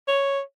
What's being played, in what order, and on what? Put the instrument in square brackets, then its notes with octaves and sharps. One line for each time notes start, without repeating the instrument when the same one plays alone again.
[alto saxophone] C#5